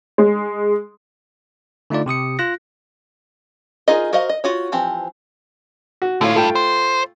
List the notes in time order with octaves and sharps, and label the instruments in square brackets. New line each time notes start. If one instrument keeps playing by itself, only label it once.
[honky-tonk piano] G#3
[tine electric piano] D3 A3 D#4 F4 D5
C3 G4 D#6 C#7
F4 F#6 A#6
[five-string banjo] D#4 F4 G#4 A#4 D#5
F#4 A#4 C5 D#5 F5
D#5
F4 F#4 C#5
E3 F3 C4 G4
[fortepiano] F#4
[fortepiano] A2 C#5 [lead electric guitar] D3 F4
[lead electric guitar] G2 [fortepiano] A3 F4 G5
[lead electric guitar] C5